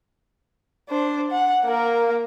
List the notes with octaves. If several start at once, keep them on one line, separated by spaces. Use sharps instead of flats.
D4 C5
F#5
A#3 A#4